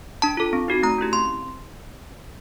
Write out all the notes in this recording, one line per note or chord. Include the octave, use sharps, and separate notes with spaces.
D4 A5
F4 A4
C4
D#4 F#4 A4
A3 A#5
C#4 E4 G4
C4 C6